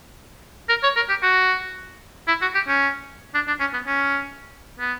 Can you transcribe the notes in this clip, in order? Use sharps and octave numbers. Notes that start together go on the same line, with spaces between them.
A#4
C#5
A#4
G4
F#4
E4
F#4
G4
C#4
D4
D4
C#4
B3
C#4
B3